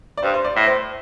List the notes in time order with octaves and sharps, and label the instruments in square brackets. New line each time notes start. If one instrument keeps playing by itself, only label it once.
[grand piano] D5
[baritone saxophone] G2 [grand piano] C5
[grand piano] C5
D5
[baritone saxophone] A2
[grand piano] C5